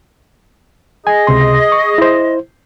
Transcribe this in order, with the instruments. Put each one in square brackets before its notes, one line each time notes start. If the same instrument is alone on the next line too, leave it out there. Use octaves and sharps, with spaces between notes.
[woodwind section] G#4 D#5 [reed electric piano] G#5
[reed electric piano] C#2 C3 C6
C#6
E4 C5